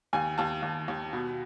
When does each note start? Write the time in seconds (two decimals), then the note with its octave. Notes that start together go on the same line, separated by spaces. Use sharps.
0.13 D#2 G#5
0.38 D#2 A5
0.62 D#2
0.88 D#2
1.13 B2